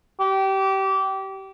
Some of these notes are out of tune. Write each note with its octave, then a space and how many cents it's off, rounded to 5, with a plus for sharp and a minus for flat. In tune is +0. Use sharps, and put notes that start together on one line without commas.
G4 -25